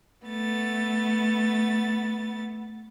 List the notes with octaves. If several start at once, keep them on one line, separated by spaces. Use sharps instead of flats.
A3 B3 A6